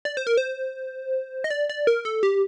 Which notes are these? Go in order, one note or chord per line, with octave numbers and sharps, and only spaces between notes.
D5
C5
A#4
C5
D#5
D5
D5
A#4
A4
G4